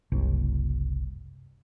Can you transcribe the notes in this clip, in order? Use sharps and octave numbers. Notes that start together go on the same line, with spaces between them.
F#1 C2